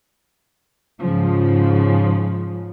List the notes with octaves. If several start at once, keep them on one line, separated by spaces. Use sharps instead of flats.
G#2 C#3 F3